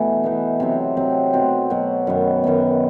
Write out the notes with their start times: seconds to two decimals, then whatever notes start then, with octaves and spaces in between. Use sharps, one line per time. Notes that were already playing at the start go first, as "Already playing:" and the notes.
Already playing: B2 E3 A3
0.24 E3 B3 D#4
0.60 C3 F#3 C4
0.97 C3 F#3 C4
1.33 B2 F#3 C4
1.70 B2 F#3 C4
2.07 F#2 D#3 F#3 B3
2.44 F#2 D#3 F#3 B3